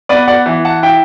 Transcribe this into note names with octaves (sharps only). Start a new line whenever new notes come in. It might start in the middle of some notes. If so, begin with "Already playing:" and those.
B3 B4 D5
D5 F#5
E3
F#5 A5
E4 E5 G5